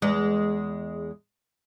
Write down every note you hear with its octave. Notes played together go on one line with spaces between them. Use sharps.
E2 G#3